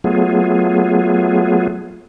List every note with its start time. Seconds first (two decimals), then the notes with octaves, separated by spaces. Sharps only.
0.04 F#3 A3 B3 F4 G#4